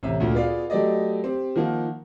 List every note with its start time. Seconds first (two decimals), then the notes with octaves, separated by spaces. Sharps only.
0.03 A1 C3 E5
0.20 D2 A#2
0.35 B3 F4 G#4 D5 F5
0.70 F#3 A3 B3 G4 D5 D#5
1.24 C4 G4
1.56 D#3 F3 A#3 F#5